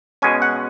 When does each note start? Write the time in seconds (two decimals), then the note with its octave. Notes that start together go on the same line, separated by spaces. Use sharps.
0.22 B2 G#3 C#4 G#5
0.42 F#5